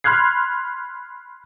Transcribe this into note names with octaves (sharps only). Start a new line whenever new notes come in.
B5 C6 F6 F#6 G#6 C7